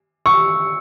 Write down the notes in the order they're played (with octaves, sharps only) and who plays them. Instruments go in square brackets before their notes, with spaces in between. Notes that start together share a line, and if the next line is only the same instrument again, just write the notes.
[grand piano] C#6 [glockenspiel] E6